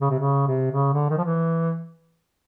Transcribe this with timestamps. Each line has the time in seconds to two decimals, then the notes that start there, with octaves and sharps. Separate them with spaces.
0.01 C#3
0.10 C3
0.19 C#3
0.47 C3
0.71 C#3
0.93 D3
1.10 D#3
1.18 F3
1.24 E3